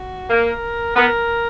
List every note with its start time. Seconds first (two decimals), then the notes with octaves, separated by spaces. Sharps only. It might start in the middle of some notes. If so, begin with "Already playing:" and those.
Already playing: F#4
0.30 A#3 A#4
0.96 B3 A#4